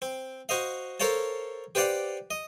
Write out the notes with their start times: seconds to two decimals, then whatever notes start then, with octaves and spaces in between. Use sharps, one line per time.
0.02 C4
0.49 F#4 C5 D#5 F5
1.00 A4 A#4 C5 C#5 F5 A5
1.75 G4 B4 C5 D5 F5 F#5
2.31 D#5